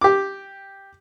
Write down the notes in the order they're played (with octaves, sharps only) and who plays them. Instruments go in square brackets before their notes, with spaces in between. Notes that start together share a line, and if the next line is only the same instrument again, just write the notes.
[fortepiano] G4 D6